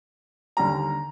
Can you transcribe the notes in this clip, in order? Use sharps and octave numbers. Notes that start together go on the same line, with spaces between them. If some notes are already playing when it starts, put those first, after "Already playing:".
D#2 D3 G3 A#5